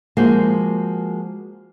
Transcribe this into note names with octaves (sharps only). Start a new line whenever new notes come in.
F3 G#3 A#3 F#4 C5